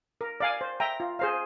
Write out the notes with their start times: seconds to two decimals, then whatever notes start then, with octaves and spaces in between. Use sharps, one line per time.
0.21 A#4
0.40 D5 F5 G#5
0.61 C5
0.80 E5 G5 A#5
1.00 F4
1.19 G#4 C5 F5